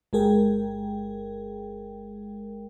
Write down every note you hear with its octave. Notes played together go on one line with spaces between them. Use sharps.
G1 G#3 G#4 A#4 G5